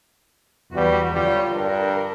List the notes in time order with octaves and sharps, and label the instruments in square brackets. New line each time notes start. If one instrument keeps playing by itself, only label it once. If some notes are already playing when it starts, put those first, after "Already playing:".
[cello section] E2 F#4 B4 [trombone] G3
[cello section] D3 F4 C#5 [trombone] G3
[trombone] G2 [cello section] A#4